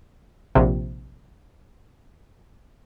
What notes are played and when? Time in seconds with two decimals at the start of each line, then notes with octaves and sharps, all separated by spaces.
0.55 A#1 C3